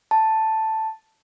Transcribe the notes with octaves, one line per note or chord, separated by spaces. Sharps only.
A5